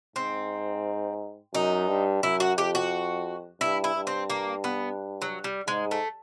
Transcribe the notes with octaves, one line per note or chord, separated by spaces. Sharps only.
G#2 C4
F#2 D#4
G2
F#2 E4
F#4
F2 G4
F#4
G2 E4
E4
G2
C4
A#3
B3
F#3
G3
G#2 G#3
A3